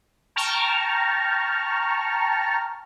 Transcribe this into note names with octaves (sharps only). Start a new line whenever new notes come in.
G5 A5 A#5 C#6 F6